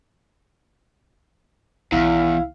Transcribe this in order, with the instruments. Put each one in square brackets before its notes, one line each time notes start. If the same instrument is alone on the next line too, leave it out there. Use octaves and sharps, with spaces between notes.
[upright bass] B1 D#3 [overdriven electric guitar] E2 [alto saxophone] E4 [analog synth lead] F5